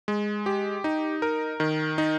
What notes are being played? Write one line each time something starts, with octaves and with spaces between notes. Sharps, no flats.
G#3
G4
D#4
A#4
D#3
D#4